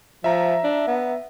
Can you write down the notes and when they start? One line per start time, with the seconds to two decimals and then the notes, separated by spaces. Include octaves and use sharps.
0.24 F3 E5 A#5
0.64 D4
0.87 B3